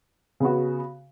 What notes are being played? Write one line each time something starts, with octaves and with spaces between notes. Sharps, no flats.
C#3 B3 F#4